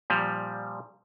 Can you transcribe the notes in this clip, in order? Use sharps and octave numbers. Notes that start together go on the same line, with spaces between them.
A#2 F3 G3